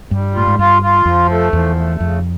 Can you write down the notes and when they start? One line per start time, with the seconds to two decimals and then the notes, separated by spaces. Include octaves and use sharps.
0.11 G2 G3
0.35 A2 F4
0.47 G#2
0.59 G2 F4
0.82 F4
1.06 F2 F3
1.30 A3
1.53 E2 F3
1.77 A3
2.00 F2 C#3